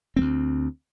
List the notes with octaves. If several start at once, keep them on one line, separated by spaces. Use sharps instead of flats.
D2 A3 C4